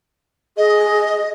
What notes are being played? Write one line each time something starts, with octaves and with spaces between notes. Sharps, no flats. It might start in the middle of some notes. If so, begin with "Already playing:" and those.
G#4 D#5